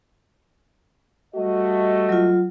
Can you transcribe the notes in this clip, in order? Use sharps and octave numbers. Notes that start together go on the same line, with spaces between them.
G3 A3 F#4 D#5
F#3 F4